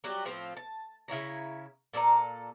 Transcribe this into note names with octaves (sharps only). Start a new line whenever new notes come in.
F#3 G3 F#4 G4
A2 F3 C4 F4
A5
C#3 E4 C#5 A#5
A#2 A4 D5 A#5